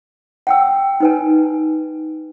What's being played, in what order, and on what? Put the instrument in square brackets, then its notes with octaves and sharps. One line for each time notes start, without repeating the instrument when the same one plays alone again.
[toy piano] F#5 G5 E6
D#4 B4 G#5